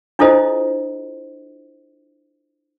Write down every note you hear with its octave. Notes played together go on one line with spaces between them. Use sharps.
D4 E4 F4 A4 C5 D#5